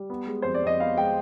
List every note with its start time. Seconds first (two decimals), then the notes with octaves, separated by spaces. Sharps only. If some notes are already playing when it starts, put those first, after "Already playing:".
Already playing: G3
0.10 B3
0.27 G#3
0.42 F2 C5
0.54 D5
0.63 F2 D#5
0.80 B3 F5
0.97 G#3 G5